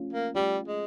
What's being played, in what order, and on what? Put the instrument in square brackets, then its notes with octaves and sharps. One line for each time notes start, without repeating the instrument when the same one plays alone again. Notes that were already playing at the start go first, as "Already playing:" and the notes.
Already playing: [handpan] A3 C#4 F4
[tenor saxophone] A#3
[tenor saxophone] G3 [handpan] A3 C#4 F4
[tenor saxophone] G#3